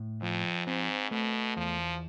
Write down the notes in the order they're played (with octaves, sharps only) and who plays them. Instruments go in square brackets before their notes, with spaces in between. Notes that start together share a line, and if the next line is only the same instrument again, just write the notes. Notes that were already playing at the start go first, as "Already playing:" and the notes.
Already playing: [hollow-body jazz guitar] A2
[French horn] F2 [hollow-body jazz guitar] F3
[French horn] G#2 [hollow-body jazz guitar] C4
[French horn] B2 [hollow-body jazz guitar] A3
[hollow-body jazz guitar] E2 [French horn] F3